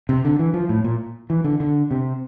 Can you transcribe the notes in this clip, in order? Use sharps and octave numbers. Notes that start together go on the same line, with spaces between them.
C3
D3
E3
F3
A2
A#2
E3
D3
D3
C3